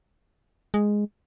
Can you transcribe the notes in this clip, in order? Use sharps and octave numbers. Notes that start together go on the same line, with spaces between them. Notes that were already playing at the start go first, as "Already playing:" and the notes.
G#3